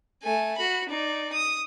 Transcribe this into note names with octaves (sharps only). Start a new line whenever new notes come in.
A3 G#5
F#4 B5
D#4 D5
D#6